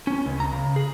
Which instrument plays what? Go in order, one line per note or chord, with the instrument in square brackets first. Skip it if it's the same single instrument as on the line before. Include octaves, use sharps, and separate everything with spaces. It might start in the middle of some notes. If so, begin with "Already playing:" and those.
[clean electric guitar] C#4
C#2
A#5
C#3
G#4